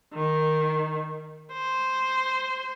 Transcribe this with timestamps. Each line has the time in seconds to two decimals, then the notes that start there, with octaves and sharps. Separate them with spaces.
0.14 D#3
1.53 C5